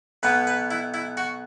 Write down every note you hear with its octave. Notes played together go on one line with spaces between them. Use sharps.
B1 B2 B3 B4
B4
E4
E4
F#4